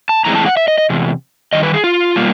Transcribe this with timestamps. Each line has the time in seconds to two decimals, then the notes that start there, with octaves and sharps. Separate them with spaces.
0.09 A5
0.25 A2 E3 G#3 C4 A#5
0.35 A5
0.46 F#5
0.57 E5
0.68 D#5
0.78 D#5
0.90 E2 C3
1.53 G2 D#3 D#5
1.63 B4
1.74 G#4
1.84 F4
2.16 B2 G3 A#3